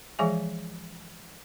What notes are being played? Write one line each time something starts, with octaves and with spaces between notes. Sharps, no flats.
E3 F3 G#3 G#4 E5 G#5